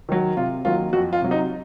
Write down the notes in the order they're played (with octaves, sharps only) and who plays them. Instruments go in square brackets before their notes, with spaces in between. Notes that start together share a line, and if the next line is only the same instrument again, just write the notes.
[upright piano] D#3 F#3
C3 F4
D#3 F#3 A#3 F4
F2 F#4
F4
C3 F#3
D#4